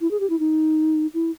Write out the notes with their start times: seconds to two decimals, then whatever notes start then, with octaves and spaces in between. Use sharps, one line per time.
0.01 E4
0.11 G#4
0.20 G4
0.30 E4
0.39 D#4
1.14 E4